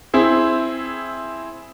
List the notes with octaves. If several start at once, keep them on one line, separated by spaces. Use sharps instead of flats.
C4 E4 G#4